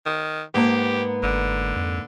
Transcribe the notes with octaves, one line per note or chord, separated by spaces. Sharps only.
D#3
G#2 A#3 B3 G4 A5
G1 D3
F2